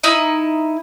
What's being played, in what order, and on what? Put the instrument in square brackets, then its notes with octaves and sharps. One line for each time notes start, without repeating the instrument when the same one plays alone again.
[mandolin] D#4 E4 D#5